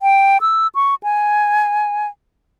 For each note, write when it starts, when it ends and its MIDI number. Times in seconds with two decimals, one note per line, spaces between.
0.01 0.38 79
0.41 0.67 88
0.75 0.95 85
1.03 2.08 80